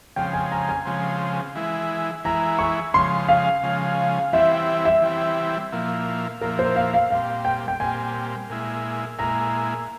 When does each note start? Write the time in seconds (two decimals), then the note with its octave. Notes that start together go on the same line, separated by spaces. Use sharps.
0.16 C#3 F3 G#3 C4 G5
0.33 G#5
0.51 A#5
0.69 G#5
0.85 C#3 F3 G#3 C4
1.55 E3 G#3 E4
2.25 E3 G#3 E4 A#5
2.59 C#6
2.94 C#3 F3 G#3 C6
3.29 F5
3.63 C#3 F3 G#3
4.33 E3 G3 C4 E4 E5
4.85 E5
5.02 E3 G3 C4 E4
5.72 A#2 F3 A#3 E4
6.41 A#2 F3 A#3 E4 A#4
6.59 C5
6.76 F5
6.94 F5
7.10 A#2 G3 C4 F5
7.45 G5
7.68 G5
7.80 A#2 G3 C4 G#5
8.50 A#2 G#3 E4
9.19 A#2 G#3 E4 A#5